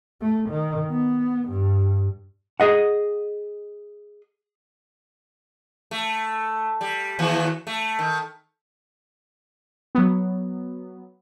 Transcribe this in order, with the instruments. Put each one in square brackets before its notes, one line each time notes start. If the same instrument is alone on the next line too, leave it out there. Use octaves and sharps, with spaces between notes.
[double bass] A3
D#3
B3
G2
[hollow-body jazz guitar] G#4 D#5 F#5
[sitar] A3
G3
D#2 E3 F#4
A3
D#3
[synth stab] F#3 B3